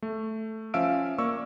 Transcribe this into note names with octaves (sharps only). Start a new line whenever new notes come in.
A3
F3 C#4 E5 F5 E6 D7
A#3 D5 C#6 E6